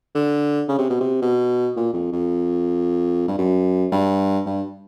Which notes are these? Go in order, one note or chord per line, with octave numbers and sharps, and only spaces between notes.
D3
C#3
C3
B2
C3
B2
A#2
F2
F2
G2
F#2
G2
G2